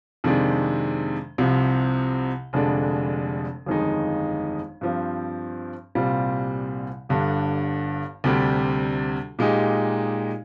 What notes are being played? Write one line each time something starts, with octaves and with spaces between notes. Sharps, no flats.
F2 C3 D#3 G#3 D4
C2 C3 F3
F1 F2 D3 G#3 D4
G1 F2 D#3 G#3 D#4
G2 F3 C4
C2 A#2 G3 C4 F4
G1 G2 D3
D2 C3 G3 D4 G4
A#2 G#3 D#4 G4